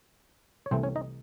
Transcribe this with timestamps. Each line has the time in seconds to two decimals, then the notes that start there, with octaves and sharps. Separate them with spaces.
0.66 C#5
0.71 C2 C3 E3 A3 C4 C5
0.83 C#4 C#5
0.96 D#4 D#5